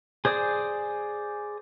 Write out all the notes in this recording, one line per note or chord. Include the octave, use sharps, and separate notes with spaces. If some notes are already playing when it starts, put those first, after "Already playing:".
G#4 C5 D5 D#6